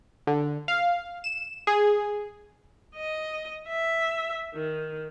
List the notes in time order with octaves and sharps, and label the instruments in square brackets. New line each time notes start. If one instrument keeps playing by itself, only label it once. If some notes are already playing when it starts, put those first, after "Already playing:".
[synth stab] D3
F5
E7
G#4
[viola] D#5
E5
D#3